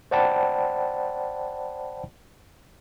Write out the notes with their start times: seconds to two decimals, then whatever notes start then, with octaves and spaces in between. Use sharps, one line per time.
0.11 C5 D5 F#5 G5 A5 B5